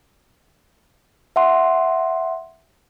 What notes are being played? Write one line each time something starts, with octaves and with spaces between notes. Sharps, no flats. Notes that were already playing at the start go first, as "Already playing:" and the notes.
E5 F#5 C6